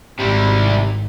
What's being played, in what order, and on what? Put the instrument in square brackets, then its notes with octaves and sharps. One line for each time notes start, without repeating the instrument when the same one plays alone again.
[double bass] G#1 G#2 [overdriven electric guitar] C3 G3